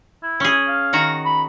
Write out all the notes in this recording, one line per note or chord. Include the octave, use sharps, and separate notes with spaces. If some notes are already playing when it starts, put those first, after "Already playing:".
E4
C#4 G#4
F5
D#3 F#4 A#5
B5